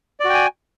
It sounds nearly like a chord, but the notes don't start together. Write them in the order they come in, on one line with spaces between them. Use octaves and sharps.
D5 F#4 G5 G#5